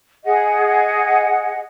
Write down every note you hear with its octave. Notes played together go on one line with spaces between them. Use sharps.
G#4 D#5 F#5